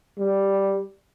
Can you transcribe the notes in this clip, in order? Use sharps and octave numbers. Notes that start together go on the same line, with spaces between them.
G3